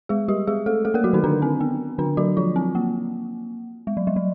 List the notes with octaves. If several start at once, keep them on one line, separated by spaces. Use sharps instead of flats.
G#3 G#4
G3 G4
G#3 G#4
A3 A4
A3 A4
A#3 A#4
F#3 F#4
D#3 D#4
D3 D4
C4
B3
D3 D4
F#3 F#4
F3 F4
C4
A#3
G#3
F#3
G3
F#3